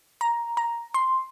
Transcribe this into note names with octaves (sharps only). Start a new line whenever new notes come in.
A#5
A#5
C6